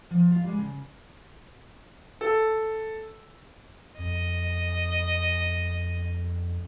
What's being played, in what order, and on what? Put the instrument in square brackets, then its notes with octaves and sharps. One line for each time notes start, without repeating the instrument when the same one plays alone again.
[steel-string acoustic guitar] F3
F4 F5
G3 G#3
C#3
[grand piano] A4
[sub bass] F2 [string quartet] D#5